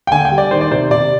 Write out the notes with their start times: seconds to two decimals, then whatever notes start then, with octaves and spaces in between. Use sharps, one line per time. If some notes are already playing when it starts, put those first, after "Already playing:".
0.07 G5
0.12 D3 G#5
0.25 G5
0.31 G3
0.38 D5
0.51 D#3 C5
0.61 D5
0.71 C3 C5
0.91 C3 D5